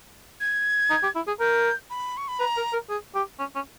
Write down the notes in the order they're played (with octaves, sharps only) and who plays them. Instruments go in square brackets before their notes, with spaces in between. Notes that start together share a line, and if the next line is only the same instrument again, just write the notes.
[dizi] G#6
[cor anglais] D#4
G4
E4
G#4
[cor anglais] A#4 [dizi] G6
[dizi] B5
C#6
B5
[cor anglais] B4 [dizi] A#5
[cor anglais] A#4
A#4
G#4
G4
C#4
C#4